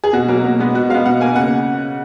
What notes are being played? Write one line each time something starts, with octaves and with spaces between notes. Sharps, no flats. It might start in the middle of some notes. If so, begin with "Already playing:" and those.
G#4
B2 F#4
F#3 A#3
B2
G#3 B3
B2 F#4
G#3 B3 F5
B2 F#5
A#3 G#5
C#3 F#5